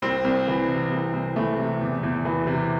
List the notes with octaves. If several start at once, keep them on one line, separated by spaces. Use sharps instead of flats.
C2 C4
C2
E3
C3
C2
C2
E3 A3
C3
E2
E2
E3
C3